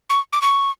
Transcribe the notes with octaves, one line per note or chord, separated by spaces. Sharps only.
C#6
D6
C#6